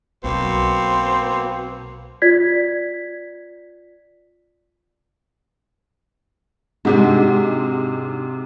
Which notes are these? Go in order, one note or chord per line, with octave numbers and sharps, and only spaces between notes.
B1 B2 A#3 C4 C5
F4 D5 G#6 B6
G#2 C3 G#3 D4 F#4